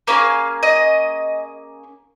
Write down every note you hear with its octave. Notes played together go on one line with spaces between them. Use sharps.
A#3 C#4 G#4 F5
D#5